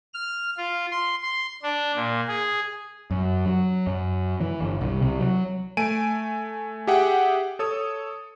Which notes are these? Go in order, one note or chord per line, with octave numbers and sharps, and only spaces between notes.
F6
F4
C6
C6
D4
A#2
G#4
F#2
F#3
F#2
E3
G1
C2
C2
F#3
A3 G#5 D7 D#7
G4 G#4 E5 F#5 G5
A4 C#5 D#6